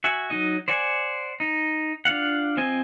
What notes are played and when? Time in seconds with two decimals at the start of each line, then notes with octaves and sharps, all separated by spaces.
0.04 F#4 E5 G#5
0.30 F#3 D#4 D#5
0.68 C5 D5 F#5 G#5
1.40 D#4
2.05 D4 F4 F5 F#5
2.57 F3 C4 D#5 G#5